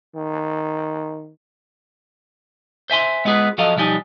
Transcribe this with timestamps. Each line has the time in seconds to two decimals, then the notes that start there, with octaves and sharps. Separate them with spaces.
0.15 D#3
2.90 C5 E5 G#5 C6
3.25 G#3 B3 F4 G#4 B4
3.58 F3 F#3 A4 D#5 F5
3.76 B1 F3 G3 D#4 G#5